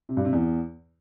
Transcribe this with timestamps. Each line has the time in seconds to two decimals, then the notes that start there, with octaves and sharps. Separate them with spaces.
0.09 C3
0.17 G2
0.25 C3
0.33 E2